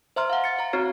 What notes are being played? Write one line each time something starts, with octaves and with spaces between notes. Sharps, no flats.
C5 E5 A#5 C6 F6
F5 F#5
A6 C#7
F5 A#5
C4 F#4 C#5